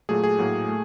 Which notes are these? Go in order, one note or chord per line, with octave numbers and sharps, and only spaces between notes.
A#2 F#3 A3 G#4
G#4
A2 F#3 A#3
A3